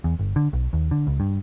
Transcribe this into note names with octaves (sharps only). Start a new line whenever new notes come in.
E2
G1
D3
B1
D#2
D3
C#2
G2